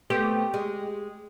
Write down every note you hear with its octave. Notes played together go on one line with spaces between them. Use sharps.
A3 B3 C4 G4
G#3